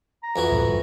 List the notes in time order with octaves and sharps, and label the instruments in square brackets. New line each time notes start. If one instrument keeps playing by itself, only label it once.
[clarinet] A#5
[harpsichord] F2 E3 F#4
[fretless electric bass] C#2 A2 G3
G1 G2